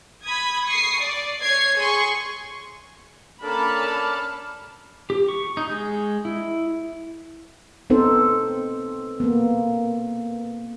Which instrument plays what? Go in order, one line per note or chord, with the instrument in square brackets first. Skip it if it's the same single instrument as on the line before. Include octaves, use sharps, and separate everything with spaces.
[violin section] B5 D#6 G#6
C#6 D#6 C7
D5
C#5 G#6 C7
G#4 G#5 C6 C#6
[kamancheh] A#3 C#4 [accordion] D4 A4 D5 [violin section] A5 B5 [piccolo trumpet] F6
[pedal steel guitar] G4
C#6
D#4
G#3
E4
[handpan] B3 C4 D#4 A4 C5
A#3 B3